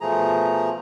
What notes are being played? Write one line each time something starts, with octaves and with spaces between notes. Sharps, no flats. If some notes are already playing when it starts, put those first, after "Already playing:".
B2 F3 A3 G#4 A#5